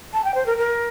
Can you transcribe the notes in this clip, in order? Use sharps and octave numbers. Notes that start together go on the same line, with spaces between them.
A5
G5
C5
A#4
A#4